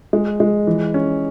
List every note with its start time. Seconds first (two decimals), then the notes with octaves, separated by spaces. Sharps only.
0.13 G#3
0.40 G#3
0.67 E3
0.94 C#4